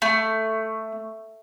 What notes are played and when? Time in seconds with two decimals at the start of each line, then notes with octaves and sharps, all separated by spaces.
0.02 A3